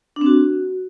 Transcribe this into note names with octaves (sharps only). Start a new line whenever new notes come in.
D4
C4
F#4